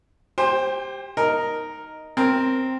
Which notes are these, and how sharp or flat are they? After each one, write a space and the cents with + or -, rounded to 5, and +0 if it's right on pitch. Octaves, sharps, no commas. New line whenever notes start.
G4 +0 C5 +10 G5 +40
D#4 +0 A#4 +0
C4 +0 A#4 +0